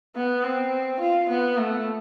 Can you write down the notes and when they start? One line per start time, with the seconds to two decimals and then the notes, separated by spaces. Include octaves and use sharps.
0.16 B3
0.43 C4
1.00 F4
1.30 B3
1.58 A3